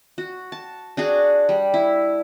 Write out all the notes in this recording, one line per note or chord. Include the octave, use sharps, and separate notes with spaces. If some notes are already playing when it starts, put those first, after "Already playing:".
F#4
A5
D4 F#4 G#4
G3
E4